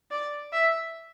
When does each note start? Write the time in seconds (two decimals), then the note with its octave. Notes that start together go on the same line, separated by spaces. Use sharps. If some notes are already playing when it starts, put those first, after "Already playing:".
0.11 D5
0.52 E5